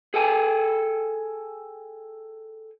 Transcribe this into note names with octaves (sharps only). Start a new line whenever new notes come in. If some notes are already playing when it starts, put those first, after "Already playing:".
G#4 A4 G5 G#5